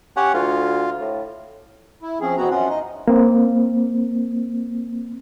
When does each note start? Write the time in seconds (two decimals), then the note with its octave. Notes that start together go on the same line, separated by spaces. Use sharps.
0.17 C#4 G4 C#5 F#5
0.34 D2 F4
1.01 A2
2.02 E4
2.21 F3 C4 C#4 G#4
2.37 E2 B2 B3 C4 F#4 A#5
2.50 F#2 F3 C#4 F4 F#5
2.69 D#4 D#5
3.08 A#3 C4